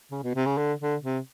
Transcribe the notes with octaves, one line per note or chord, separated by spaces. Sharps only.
C#3
B2
C3
C#3
D3
D3
C3